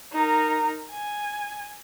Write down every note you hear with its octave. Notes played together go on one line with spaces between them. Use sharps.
D#4 A#4
G#5